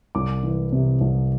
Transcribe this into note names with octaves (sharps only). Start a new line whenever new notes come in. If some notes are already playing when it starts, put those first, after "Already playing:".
C2 D6
E3
C3
C2